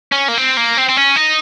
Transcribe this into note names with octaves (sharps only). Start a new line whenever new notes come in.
C#4
A#3
C4
A#3
C4
C4
C#4
D#4